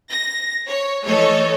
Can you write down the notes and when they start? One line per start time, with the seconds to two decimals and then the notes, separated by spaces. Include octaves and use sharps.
0.10 A#6
0.68 C#5
1.06 E3 A3 A4 C#5 D#5